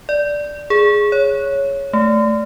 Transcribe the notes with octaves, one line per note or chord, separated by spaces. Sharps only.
D5
G#4
C#5
A3